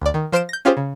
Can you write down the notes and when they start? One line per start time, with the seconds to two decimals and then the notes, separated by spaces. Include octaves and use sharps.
0.01 D2 D5
0.14 D#3
0.32 F3 C5 F6 C7 D7 E7
0.49 G6 A#6
0.65 C#4 F4 G4 G#4 C5
0.77 C#3